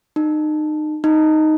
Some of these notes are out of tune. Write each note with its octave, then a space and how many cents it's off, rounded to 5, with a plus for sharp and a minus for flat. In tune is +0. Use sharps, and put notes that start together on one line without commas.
D#4 -30
D#4 +0